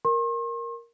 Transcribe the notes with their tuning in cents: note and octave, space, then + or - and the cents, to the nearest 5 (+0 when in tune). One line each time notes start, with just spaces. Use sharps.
A#4 +0 C6 +45